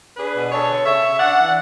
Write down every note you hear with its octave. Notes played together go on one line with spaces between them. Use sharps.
D4 G#4 B4
B2
D4 A4 C#5
D3
C#3 C#5 E5
C#3
D4 D5 F#5
E3